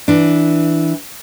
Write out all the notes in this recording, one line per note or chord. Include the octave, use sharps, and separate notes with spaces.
E3 D4